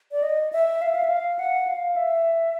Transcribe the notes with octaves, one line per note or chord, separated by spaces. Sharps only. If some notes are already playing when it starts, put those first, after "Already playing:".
D5
D#5
E5
F5
E5
F5
E5
F5
F#5
F5
E5